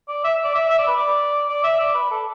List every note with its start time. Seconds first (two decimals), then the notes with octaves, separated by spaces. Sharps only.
0.08 D5
0.24 E5
0.44 D5
0.55 E5
0.70 E5
0.79 D5
0.87 B4
0.96 D5
1.49 D5
1.64 E5
1.80 D5
1.95 B4
2.11 A4